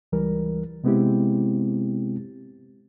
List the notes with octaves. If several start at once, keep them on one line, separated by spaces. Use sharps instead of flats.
C#2 E3 G3 A#4
C3 G#3 B3 C4 E4 G4